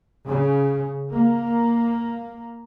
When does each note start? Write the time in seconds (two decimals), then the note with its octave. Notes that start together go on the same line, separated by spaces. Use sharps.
0.28 C#3
1.12 A#3